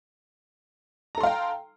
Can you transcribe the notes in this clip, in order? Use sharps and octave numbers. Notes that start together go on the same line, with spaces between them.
A4 F5 G5 A#5 C6